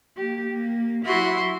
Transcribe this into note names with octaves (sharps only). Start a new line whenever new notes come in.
A#3 G4
A#3
F#3 E4 F#4 C6